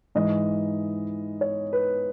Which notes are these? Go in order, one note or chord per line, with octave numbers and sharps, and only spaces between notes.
G#2 E3 G#3 D#5
C#5
B4